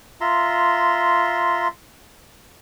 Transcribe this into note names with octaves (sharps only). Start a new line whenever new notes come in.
F4 E5 A#5 C6